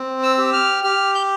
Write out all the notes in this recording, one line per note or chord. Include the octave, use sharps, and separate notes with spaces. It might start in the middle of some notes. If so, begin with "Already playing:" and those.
Already playing: C4
E6
G4
F6
G4 F6
G6